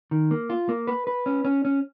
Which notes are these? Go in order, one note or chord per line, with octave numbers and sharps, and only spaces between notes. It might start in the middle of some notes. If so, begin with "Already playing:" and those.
D#3
A#3
F4
A#3
B4
B4
C#4
C#4
C#4